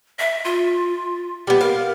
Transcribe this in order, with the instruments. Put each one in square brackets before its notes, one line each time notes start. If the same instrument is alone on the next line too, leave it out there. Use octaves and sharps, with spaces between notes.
[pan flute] E5
F4
[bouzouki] G3 B3
[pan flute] A#4 [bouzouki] F5